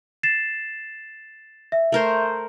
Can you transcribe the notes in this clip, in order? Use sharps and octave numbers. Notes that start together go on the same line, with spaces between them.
A6 C7 E7
E5
A3 A#4 C5